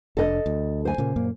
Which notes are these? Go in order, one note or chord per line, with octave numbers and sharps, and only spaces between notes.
F1 D4 A4 D#5
D2
C5 G#5
A#2 C#3 A#3
F#2 A#2 A#3